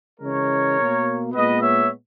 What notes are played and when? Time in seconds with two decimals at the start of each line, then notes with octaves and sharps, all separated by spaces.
0.20 C#3 E3 G#3 A#4 C#5
0.77 B2 A#3
1.33 A#2 G#3 B3 B4 D#5
1.62 C#5 E5